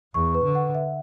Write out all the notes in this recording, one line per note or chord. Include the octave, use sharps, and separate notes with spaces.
E2 C#6
B4
D3
F#5
E5